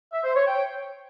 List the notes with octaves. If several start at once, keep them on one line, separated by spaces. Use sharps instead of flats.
E5
C5
C#5
G5